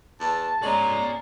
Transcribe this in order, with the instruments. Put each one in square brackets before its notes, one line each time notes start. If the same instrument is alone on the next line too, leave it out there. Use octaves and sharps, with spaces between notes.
[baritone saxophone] E2 [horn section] A5
[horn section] G#3 [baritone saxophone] C#4 [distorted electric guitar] D5 A#5